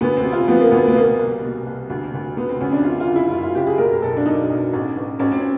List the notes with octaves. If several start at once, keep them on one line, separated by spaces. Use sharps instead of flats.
D2 B3
C4
C3
F4
F3 B3
A#3
D2 B3
B3
B2 A#3
C2
B2
C2
D2
D2
D2 B3
C4
D2 C#4
D4
F#2 F4
F4
F#1
E4
F#2 F4
F4
F#1 G4
G#4
B2 A#4
A#4
B1 A4
D4
B1 D#4
B1
A1
A1
A1 C#4
C4